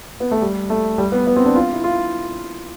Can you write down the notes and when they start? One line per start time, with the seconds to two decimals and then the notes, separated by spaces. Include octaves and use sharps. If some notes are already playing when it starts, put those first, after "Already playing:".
0.20 B3
0.31 A3
0.41 G3
0.70 A3
0.98 G3
1.12 B3
1.27 B3
1.36 C4
1.46 D4
1.55 F4
1.73 E4
1.84 F4